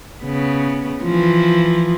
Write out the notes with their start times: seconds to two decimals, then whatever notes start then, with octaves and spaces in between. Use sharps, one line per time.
0.23 C#3 B3
1.03 E3 F3